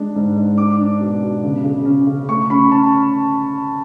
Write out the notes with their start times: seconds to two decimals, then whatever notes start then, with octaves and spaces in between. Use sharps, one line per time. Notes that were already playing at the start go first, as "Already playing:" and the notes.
Already playing: G#3 D4
0.15 G#2
0.36 G#2
0.58 D4 D6
0.79 D4
1.01 B2
1.22 B2
1.43 C#3
1.64 C#3
1.85 C#4
2.07 C#3
2.28 A3 C#6
2.50 C#4 B5
2.71 C#4 A5